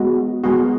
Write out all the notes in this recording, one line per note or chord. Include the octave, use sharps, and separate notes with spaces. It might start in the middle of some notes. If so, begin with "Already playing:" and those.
Already playing: G#3 B3 F#4
G#3 B3 F#4